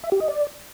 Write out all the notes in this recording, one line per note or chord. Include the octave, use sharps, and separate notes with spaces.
E5
G4
D#5
D5